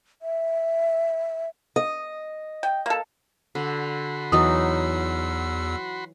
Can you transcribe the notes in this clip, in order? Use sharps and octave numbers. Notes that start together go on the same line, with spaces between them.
E5
D#5
G5
A#3 A4
D3 F#4 B5 C6
E2 E3 F#3 D#4 D#5 D#6 E6